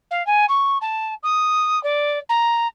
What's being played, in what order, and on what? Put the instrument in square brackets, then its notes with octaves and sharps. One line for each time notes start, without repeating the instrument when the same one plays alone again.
[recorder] F5
G#5
C#6
A5
D#6
D5
A#5